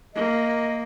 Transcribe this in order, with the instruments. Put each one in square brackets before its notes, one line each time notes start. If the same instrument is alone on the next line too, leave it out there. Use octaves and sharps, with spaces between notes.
[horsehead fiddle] A#3 [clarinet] D#5